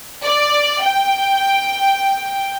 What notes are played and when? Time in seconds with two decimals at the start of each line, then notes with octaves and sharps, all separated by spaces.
0.24 D5
0.83 G5